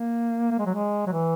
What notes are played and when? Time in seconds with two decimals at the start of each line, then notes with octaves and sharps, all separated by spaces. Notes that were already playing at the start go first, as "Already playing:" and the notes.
Already playing: A#3
0.51 A#3
0.58 G#3
0.66 F#3
0.74 G#3
1.07 F#3
1.12 E3